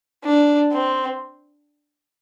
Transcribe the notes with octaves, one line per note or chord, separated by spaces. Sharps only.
D4
C4